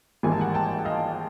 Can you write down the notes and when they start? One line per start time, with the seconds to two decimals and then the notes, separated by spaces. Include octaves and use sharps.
0.23 G#1 G#2 E3 G3 A#3 G#5
0.32 A5
0.40 F#5 G#5
0.54 G5 A5
0.85 D#5 F5